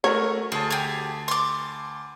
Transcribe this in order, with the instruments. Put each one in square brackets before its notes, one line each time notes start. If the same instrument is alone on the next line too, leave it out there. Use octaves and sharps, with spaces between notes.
[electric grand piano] A3 F#4 A#4 [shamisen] C#5
[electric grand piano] D2 A5 [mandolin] G#4
[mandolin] G4 G#4
C6 D6